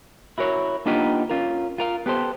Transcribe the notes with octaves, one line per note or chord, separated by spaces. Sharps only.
E4 F#4 A#4 C#5
A#3 B3 D4 D#4 F4 G4
C#4 F4 A#4
F4 A#4 F5
B3 G4 A4 C5